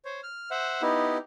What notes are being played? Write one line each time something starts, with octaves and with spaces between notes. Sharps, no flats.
C5 C#5
F6
C5 E5 F#5
B3 D#4 E4 G4